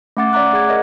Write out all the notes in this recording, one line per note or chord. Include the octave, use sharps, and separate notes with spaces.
A3 C#4 F#5 D6 A6
C#5 D5 E5 A#5 D6 F#6
G#4 F#5 G#6
A#4 C#5 D#5 E5